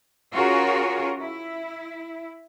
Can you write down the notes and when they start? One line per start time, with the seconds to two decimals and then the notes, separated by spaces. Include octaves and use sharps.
0.33 C#4 F4 F#4 G#4 A#4 C#5
1.19 E4